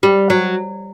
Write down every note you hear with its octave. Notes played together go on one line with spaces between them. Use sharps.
G3
F#3